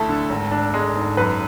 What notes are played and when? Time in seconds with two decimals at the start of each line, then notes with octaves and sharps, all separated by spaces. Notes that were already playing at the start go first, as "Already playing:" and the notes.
Already playing: D2 A3 E4 A4
0.09 D3
0.30 G#1
0.52 D4
0.74 G#3
0.96 G#2
1.17 F#2 B4